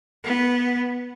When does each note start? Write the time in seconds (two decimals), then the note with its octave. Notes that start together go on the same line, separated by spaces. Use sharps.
0.23 B3